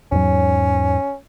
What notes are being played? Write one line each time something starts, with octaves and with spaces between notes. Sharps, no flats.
E2 G#2 F#3 C#4